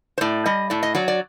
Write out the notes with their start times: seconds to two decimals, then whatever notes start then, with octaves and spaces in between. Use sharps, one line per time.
0.18 C5
0.21 A2 D5
0.46 G3 D#5
0.70 A2 D5
0.83 D#5
0.95 F#3 D5
1.08 D5